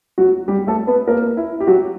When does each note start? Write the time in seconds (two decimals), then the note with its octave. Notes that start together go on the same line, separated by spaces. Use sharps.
0.18 F#3 F#4
0.48 G3 G4
0.67 A3 A4
0.87 B3 B4
1.08 A#3 A#4
1.37 E4
1.60 G4
1.67 F#3 F#4